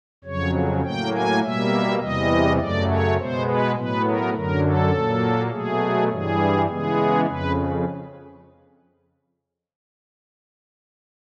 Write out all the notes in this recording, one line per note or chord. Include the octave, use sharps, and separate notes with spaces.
F2 C#3 F#3 C#5
A2 F#3 A#3 G5
G#5
B2 G3 A#3 E5
E2 C3 E3 G3 D#5
F#2 C#3 F#3 A3 D5
C#5
B2 G#3 B3 C5
B4
A2 F#3 B3 B4
A#4
F#2 D3 F#3 A#4
A4
A#2 F#3 A#3
B2 F#3 A3 G#4
G2 E3 G3 G#4
C#3 E3 G#3 B3 G#4
F2 C#3 B4